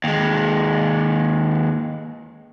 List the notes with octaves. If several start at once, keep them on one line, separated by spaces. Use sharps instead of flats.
D#2 G#3